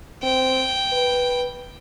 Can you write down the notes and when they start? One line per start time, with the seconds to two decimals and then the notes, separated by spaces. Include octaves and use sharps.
0.23 C4 G5
0.92 B4